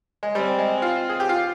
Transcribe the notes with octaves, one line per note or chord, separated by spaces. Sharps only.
G#3
G3 C4
G#3
F4
G#4
G4
F4